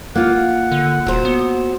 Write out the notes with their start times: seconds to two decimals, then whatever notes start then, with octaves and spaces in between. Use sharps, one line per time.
0.15 A#3 F4 F#5
0.72 D3
1.06 D#1 F#3 C5
1.25 B3